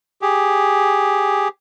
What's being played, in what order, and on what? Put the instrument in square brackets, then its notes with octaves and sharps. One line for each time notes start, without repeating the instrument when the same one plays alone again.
[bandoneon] G4 G#4